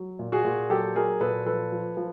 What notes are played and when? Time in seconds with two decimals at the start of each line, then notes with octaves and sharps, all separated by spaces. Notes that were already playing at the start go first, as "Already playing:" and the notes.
Already playing: F#3
0.19 A#2
0.32 F#4 G#4
0.44 A#2
0.70 F#3 G4 A4
0.95 F#3 G#4 A#4
1.20 A#2 A4 B4
1.46 F3 A4 B4
1.72 F3
1.97 F3